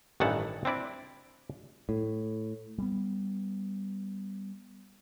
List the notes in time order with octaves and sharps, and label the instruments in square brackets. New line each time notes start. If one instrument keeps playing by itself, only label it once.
[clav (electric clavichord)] A1 G2 D#3 E3 F#5 A5
C4 D4 E4 D5
[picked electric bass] A2
G3 B3